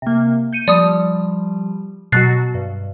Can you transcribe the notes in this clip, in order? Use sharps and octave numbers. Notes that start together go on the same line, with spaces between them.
C3 A#3
G6 C#7 D#7
F3 G3 D5 D#6
B2 F#3 F#4 F#6 A6 C7
G2